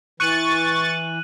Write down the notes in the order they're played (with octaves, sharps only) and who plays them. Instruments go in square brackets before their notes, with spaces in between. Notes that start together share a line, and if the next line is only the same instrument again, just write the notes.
[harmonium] E3 [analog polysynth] C#6 A6 [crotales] F#6 D#7 F#7